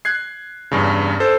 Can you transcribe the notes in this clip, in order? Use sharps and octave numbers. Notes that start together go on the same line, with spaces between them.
F#6 G#6 C7
E2 G2 C#3
A4 C5